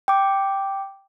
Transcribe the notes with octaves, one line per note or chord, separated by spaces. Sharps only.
G5 D6